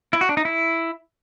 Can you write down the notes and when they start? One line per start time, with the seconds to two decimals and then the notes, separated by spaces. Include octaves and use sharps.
0.13 E4
0.21 F#4
0.29 D4
0.37 D#4
0.45 E4